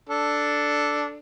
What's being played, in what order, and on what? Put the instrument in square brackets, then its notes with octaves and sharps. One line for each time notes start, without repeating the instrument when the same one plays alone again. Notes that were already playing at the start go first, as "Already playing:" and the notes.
[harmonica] D4 A4